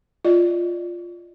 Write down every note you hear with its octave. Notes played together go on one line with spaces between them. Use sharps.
F4 D5 D#5